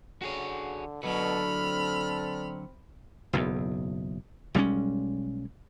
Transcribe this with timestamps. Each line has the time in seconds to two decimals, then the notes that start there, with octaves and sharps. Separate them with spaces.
0.22 D3 F#4 G#4 C#5
1.03 B2 D3 F#3 D4 A4 B5 F6
1.62 C4
3.33 F#1 B1 E2
4.54 B1 G3 G#3 C#4